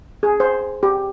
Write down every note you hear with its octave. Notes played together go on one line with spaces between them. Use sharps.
G#4
C5
G4